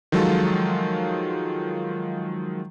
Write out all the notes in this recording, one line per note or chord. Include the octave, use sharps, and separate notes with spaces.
D#3 F3 F#3 G#3 F4 A4